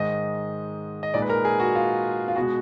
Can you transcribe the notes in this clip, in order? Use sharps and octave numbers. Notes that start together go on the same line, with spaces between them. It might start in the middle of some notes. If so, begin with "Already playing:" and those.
Already playing: G#2 D#3 G#3 D#5
D#5
A#2 G#3 D#4 D5
B4
A#4
G#4
F#4
F4
F4
B2 G#3 B3 F#4